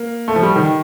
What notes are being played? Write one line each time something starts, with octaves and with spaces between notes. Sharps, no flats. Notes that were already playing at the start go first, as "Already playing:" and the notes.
Already playing: A#3
A3
F3
G3
D#3